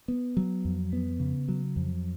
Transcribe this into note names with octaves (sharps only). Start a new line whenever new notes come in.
B3
F#3
F2
B3
C#3
F#3
F2